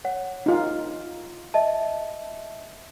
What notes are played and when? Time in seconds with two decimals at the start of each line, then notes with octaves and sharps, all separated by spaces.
0.05 C#5 F#5
0.46 D#4 F4
1.54 D#5 E5 A5